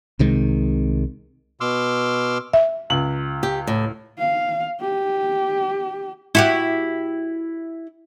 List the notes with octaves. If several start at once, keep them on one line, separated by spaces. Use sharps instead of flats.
C2 C3 D#3 G#3
B2 C6 D6 E6 F6
E5
C#2 F#7
G4
A2
F5
G4
E4 F#4 G4